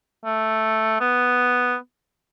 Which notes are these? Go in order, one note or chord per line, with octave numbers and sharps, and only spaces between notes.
A3
B3